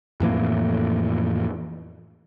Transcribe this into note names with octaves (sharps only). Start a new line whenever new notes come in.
F2 A2 E3 A#3